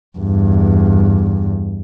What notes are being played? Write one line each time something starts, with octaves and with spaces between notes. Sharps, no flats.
E2 G2